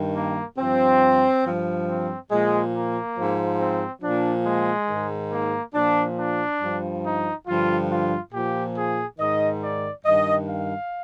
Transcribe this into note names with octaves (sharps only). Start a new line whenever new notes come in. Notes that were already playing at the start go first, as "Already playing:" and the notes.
Already playing: G2 D#3
A#3
G2 F3 C4
G2 F3
C4
A#2 F3 G#3
A#3
G#2 F3
C4
A#2 F3 D4
G#3
G#2 D#3
A#3
A#2 F3 D4
D4
G2 F3
D#4
G2 D3 F3 F4
F4
A#2 F3 G4
G#4
G#2 D#3 D#5
D5
G2 D#3 D#5
F5